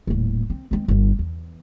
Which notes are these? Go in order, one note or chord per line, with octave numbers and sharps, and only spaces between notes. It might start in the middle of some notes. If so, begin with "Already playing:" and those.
D#1 A2
C4
G#3 C4
G1 G2
E2